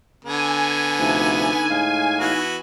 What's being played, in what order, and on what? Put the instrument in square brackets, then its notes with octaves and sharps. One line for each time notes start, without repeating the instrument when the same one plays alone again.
[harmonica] D3 B3 [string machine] G#5
[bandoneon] D2 C3 F3 [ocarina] D#4
[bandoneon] A2 G#3 F5
[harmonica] E3 B3 F#4